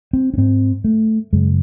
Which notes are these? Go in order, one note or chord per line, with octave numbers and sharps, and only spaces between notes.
C4
C#4
G#2 C4
A3
F#2 C#3 G#3